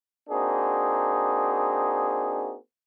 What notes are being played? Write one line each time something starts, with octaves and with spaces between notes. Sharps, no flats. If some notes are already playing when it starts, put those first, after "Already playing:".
A#3 C4 D4 D#4 F#4 G#4